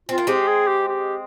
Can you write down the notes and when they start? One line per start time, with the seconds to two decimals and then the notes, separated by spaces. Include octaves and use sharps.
0.09 C4 F4
0.18 A#3
0.27 G#3 C4 G4
0.48 G#4
0.68 G4
0.88 G4